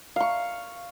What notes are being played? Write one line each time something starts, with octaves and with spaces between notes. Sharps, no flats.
F5 C#6